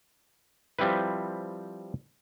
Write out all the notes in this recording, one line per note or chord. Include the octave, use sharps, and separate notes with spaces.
F3 G3 C4 E4 B4